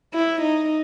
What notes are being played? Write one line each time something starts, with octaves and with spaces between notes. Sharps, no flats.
E4
D#4